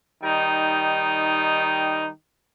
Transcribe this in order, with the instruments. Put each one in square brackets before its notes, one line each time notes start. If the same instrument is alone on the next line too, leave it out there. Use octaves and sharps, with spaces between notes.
[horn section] D#3 G3 D#4